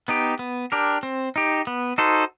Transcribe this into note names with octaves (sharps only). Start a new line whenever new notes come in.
B3 D#4 G4
B3
D4 G4 A#4
C4
D#4 G4
B3
D#4 F#4 A4 C5